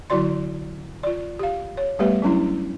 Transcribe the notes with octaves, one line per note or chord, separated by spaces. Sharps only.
D3 F#3 E4 F#4 D5 C6
F4 D5
G4 F5
C#5
G3 A3 B3 G4 B4 E5
F#3 C#4 D4 E4